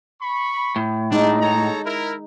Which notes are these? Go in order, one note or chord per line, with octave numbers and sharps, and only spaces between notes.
B5 C#6
A2
G3 G#3 C4 D4 D#4
A4 C#5 A#5
E4 A#4